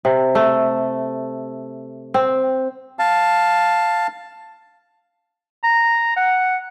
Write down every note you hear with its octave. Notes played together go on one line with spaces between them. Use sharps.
C3
A3
C4
F5 A5
A#5
F#5